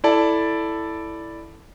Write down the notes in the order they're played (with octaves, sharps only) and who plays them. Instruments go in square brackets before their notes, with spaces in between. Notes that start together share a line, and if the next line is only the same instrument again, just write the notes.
[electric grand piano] E4 A4 D5 A5